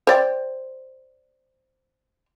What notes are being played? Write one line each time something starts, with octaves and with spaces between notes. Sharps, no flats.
C5 D5 G5